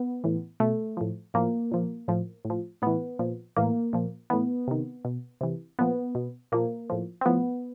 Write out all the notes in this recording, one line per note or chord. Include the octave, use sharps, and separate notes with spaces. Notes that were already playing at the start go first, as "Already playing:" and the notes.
Already playing: B3
A2 E3
B2 A3
A2 F3
A2 F3 A#3
A#2 F3
A2 F3
A2
F3
A2 E3 B3
A#2 F3
A2 E3 A#3
A#2 F3
A2 E3 B3
C3 D#3
B2
C3 E3
A#2 F3 B3
B2
A#2 F3 A#3
A2 F3
C4
A2 F3 B3